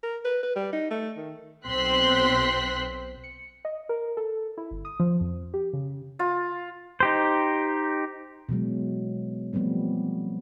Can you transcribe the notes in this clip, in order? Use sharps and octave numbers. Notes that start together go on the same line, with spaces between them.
A#4
B4
B4
G3
D#4
A3
D#3
B1 C4 C5 C6 F#6 B6
C#7
D#5
A#4
A4
E4
G1
D#6
F3
F2
G4
C#3
F4
D#4 G4 C5
B2 E3 F#3 G#3
F3 G3 A3 B3 C4